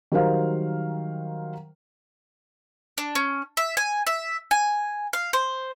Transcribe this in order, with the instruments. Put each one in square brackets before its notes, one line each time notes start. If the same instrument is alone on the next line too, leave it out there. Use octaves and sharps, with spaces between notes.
[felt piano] D#3 F#3 G3 A#4 C5 F5
[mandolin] D4
C#4
E5
G#5
E5
G#5
F5
C5